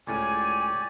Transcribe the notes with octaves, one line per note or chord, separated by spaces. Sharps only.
C#2 A2 G4 C#5 D5 G#5